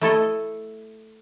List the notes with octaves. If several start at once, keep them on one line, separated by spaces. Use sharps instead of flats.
A3 E4 A4 D#5